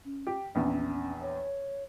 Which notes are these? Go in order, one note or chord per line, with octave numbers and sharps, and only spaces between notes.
C#4
G4
A#1 E2 C#4
C#5